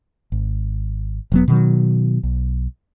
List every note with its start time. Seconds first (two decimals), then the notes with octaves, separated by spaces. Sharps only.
0.32 G#1
1.32 E1 F#3 B3
1.48 B2 D#3 F#3
2.23 B1